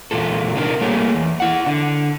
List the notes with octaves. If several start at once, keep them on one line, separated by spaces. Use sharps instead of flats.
E2 A#2 F4 A4
C3 D4 D#4 A#4
G3 A3 A#3 G#4 C#5
E2
E4 F#5
D3